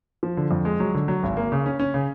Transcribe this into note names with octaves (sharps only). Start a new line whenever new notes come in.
F3
D3
F2
G#3
F#3
D3
F#3
G#1
A#3
C#3
C#4
C#4
C#3